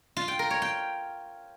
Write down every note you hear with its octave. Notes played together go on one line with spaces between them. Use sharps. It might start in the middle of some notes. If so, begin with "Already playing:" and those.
F4
G5
A#4
C#5
G5